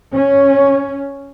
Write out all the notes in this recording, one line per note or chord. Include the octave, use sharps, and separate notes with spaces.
C#4